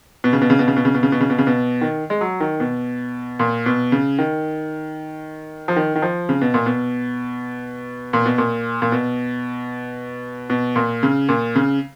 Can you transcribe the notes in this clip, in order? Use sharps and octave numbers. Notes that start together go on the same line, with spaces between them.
B2
C#3
B2
C#3
B2
C#3
B2
C#3
B2
C#3
B2
C#3
B2
C#3
B2
D#3
G#3
F#3
D#3
B2
A#2
B2
C#3
D#3
F3
D#3
D#3
F3
C#3
B2
A#2
B2
A#2
B2
A#2
A#2
B2
B2
A#2
C#3
A#2
C#3